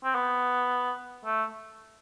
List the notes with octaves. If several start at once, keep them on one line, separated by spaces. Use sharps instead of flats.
C4
B3
A3